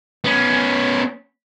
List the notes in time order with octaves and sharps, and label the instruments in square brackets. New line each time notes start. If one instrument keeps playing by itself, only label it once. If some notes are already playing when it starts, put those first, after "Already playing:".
[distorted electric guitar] B3 C#4